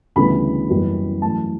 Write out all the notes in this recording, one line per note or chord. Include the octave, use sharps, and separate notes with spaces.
D2 C#3 E3 G3 B3 B5
F#1 F#2 E3 G3 B3
F#2 E3 A3 A5